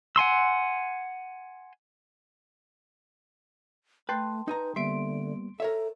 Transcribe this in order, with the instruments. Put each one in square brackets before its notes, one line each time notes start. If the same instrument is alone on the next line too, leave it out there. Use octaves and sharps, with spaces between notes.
[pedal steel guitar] F#5 G#5 C6 E6
[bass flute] A3 [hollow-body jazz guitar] B4 [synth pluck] G5 A5 C6
[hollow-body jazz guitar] D#4 G#5 A#5 [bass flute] B4 [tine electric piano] G6
[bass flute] D3 [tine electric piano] G3 A#3 B3 [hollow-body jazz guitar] E5 [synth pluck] C6 D7
[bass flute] A4 [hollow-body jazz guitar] A#4 C#5 E5